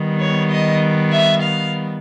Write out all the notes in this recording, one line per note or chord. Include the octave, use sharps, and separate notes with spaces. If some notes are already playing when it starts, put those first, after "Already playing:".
Already playing: D#3 G3 B3
C#5
D#5
E5
F5